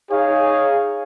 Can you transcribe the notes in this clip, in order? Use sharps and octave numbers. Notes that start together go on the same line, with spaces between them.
D#4 G#4 C#5 F5